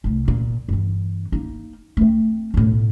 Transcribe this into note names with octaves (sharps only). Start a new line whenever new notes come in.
C2 A3
A#2
G2 E3
A#3 D#4
A3 C4
B1 A2